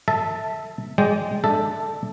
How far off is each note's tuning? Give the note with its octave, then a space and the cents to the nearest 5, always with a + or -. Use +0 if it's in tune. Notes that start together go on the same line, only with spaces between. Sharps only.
A4 +30 E5 -15 A5 +0
G#3 -5 D5 -20 G5 +0
D4 +20 A4 +0 E5 +0